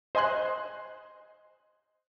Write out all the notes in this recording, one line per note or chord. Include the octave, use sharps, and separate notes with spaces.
C5 D#5 G#5 C6 F#6